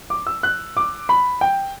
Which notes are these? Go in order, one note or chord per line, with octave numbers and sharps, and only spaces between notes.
D6
E6
F#6
D6
B5
G5